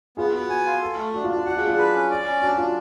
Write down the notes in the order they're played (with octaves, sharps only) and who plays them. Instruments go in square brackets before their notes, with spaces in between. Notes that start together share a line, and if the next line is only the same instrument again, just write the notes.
[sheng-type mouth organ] B3 [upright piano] F4 G#4
[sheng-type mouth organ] B3 [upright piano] F#4
[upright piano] F#4 [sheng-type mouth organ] G#5
[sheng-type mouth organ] F4
A4
A3
[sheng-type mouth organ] D4 [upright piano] F#4
[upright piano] F4
[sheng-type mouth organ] D4
[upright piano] F4
[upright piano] F#4 [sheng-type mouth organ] F#5
[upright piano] F4 G#4
[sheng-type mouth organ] D4
[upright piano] F4 G#4
[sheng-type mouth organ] B4
C#4
D5
C#4
[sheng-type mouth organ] D4 [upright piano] F#4
[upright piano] F#4
[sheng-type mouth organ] D4 [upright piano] F4